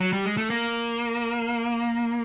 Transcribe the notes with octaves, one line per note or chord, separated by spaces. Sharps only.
F#3
G3
G#3
A3
A#3